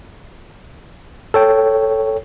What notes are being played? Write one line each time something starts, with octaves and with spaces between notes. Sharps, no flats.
A4 C#5 G5